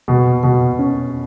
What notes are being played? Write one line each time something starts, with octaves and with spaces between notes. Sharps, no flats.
B2
B2
C#4